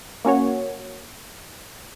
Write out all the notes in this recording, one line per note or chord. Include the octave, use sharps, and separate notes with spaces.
A#3 C#4 F#4 C#5